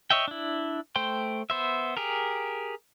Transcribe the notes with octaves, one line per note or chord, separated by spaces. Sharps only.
C#5 D#5 E5 G5
D4 E4
A3 C5 G5 C6
B3 C5 E5
G4 G#4 A#4